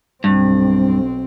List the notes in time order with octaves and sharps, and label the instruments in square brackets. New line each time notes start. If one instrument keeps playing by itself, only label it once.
[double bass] B1 C4 [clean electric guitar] G2